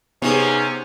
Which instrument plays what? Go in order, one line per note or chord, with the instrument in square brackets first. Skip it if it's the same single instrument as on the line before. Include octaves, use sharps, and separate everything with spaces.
[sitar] C3 [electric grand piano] B3 D#4 G#4 [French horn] C#4